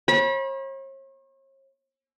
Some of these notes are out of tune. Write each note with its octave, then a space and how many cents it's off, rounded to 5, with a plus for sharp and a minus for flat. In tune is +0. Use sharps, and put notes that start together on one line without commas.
C#5 -45 B5 -35